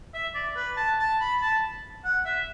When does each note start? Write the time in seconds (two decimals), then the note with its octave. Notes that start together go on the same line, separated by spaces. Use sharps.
0.14 E5
0.35 D5
0.56 B4
0.77 A5
0.99 A5
1.20 B5
1.41 A5
2.05 F#5
2.25 E5